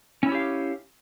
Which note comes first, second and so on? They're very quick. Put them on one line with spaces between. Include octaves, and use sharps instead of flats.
C#4 E4 C#5 G4 F5